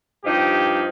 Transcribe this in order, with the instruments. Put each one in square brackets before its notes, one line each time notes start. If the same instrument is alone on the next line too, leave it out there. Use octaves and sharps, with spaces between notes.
[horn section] G2 F3 D#4 G4